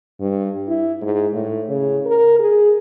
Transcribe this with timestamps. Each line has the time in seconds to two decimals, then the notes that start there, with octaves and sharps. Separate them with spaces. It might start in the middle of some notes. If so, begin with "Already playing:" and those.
0.20 G2
0.68 E4
1.02 G#2
1.34 A2
1.69 C#3
2.06 A#4
2.39 G#4